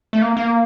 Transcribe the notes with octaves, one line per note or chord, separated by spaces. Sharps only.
A3
A#3
A#3